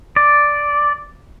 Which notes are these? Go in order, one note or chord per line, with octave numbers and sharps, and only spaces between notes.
D5